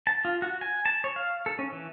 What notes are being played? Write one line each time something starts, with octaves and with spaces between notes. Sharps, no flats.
A5
F4
F#4
G#5
A5
C#5
F5
A4
C#4
E3